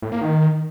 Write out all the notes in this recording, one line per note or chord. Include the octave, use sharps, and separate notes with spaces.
A2
A#3
D#3